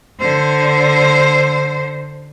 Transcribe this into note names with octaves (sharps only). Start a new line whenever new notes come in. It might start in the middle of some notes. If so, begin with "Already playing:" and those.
D3 C5